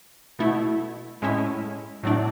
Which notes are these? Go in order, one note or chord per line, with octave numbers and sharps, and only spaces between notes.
B2 A3 E4
A2 G#3 C#4 E4
A2 F#3 A3 D4